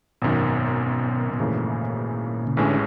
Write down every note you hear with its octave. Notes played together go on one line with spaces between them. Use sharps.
G#1 F#2 B2 D#3
B2
G#1 F#2 A#2 C#3 E3 A3
C#3
A1 A2 D3 E3 G#3 C#4